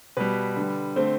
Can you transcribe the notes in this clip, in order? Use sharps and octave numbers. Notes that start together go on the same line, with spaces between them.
B2 G3 B4
D3 G3
D3 A3 C4 C5